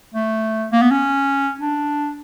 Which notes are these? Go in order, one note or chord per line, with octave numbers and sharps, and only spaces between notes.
A3
A#3
B3
C#4
D4